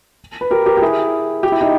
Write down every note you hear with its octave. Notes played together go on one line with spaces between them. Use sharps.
B4
G4 A#4
G4 A#4
G4
E4 G#4
G4
E4
D#4 G4